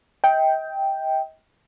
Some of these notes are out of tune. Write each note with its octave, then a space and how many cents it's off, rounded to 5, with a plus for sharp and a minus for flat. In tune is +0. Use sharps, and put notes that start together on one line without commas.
D#5 +40 G5 +0